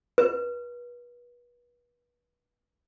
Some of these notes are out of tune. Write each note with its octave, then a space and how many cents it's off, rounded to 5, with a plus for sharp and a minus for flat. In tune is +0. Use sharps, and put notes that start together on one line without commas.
B4 -35